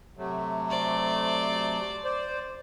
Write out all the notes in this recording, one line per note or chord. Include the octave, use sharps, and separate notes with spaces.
C3 F#3 A3
C5 D5
C5 D5